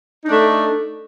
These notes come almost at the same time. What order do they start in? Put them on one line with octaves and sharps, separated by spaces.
D#4 D4 A3